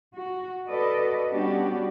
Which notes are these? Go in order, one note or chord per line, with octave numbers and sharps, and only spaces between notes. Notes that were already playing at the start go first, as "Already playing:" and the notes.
F#4
F#4 A4 B4 D5 D#5
G3 B3 C#4 D4 F#4 G4